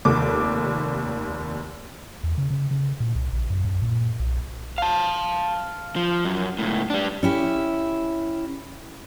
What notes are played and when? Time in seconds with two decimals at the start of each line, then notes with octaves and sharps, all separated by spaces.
0.05 F1 D#2 D6
2.24 E2
2.38 C#3
2.50 C#3
2.71 C#3
3.00 A#2
3.15 C2
3.33 A#1
3.50 F#2
3.65 F#2
3.82 A#2
4.20 B1
4.78 F5 A5
5.96 F3
6.25 F#2
6.58 C#2 A2
6.90 G3 D4
7.23 C#4 E4 G4